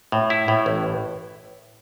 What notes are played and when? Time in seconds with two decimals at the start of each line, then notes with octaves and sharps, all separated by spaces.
0.12 A2
0.30 E4
0.48 A2
0.66 A1